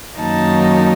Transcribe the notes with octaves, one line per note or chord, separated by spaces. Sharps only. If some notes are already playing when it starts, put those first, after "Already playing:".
F#2 D#3 F#3 A#3 D#4 A5